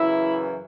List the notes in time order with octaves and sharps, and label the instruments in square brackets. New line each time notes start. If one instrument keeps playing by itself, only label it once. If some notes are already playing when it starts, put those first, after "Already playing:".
Already playing: [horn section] F#2 C#3 E3 E4